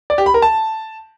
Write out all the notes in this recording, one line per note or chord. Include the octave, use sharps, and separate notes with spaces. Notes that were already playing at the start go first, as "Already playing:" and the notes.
D5
G4
B5
A#4
A5